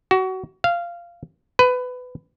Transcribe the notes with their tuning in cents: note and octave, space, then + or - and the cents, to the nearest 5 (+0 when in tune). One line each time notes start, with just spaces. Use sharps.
F#4 +25
F5 -15
B4 +20